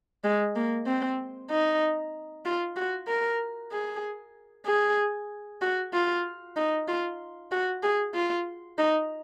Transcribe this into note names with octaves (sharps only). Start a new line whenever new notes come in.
G#3
A#3
C4
D#4
F4
F#4
A#4
G#4
G#4
F#4
F4
D#4
F4
F#4
G#4
F4
D#4